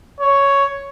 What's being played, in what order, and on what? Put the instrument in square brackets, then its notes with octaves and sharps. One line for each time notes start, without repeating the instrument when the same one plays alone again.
[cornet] C#5